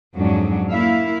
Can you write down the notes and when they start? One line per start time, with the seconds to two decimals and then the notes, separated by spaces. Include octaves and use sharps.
0.15 F2 G#2 F#3 C#4 D4
0.70 A#3 E4 E5 F5